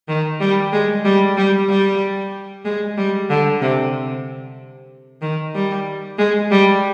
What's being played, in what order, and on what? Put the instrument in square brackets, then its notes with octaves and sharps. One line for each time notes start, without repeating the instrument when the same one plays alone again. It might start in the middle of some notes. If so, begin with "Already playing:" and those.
[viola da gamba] D#3
G3
G#3
G3
G3
G3
G#3
G3
D3
C3
D#3
G3
G#3
G3